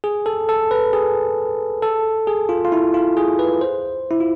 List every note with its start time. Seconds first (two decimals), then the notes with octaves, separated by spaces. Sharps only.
0.04 G#4
0.26 A4
0.49 A4
0.71 B4
0.93 G#4
1.82 A4
2.27 G#4
2.49 F4
2.65 F4
2.72 E4
2.94 F4
3.17 G#4
3.39 B4
3.61 C5
4.11 E4
4.20 F4